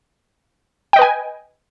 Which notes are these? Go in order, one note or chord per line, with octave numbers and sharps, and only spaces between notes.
B4 D#5 G5 G#5